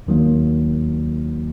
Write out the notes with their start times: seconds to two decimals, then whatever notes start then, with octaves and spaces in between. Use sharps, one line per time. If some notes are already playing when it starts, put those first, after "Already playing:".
0.07 D#2 D#3 F#3 A#3